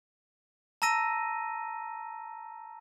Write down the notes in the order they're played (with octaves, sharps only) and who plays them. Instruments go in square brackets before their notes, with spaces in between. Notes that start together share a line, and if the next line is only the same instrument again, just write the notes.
[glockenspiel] A5 A#5 E6 A#6 D#7